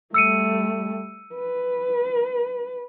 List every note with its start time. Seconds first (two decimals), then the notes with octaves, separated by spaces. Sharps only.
0.14 G3 A3 E6 C#7 D#7
1.34 B4